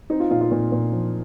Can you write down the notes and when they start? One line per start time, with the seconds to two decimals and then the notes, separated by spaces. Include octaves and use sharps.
0.10 C4 D#4
0.20 F4
0.30 A#2 F4
0.41 F4
0.51 A#2
0.72 A#2
0.92 F3